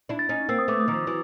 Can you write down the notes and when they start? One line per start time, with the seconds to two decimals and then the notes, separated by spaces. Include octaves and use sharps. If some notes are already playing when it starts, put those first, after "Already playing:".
0.09 D4 E4
0.19 A6
0.29 C#4 D#4
0.49 A#3 C4 E6
0.59 D#6
0.68 A3 B3 D6
0.80 D#6
0.88 D#3 F3
1.07 E3 F#3